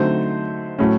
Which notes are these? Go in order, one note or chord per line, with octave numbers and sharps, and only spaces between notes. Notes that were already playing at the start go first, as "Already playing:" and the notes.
Already playing: D3 F#3 A3 C4 D#4 C5
A2 F#3 A3 C#4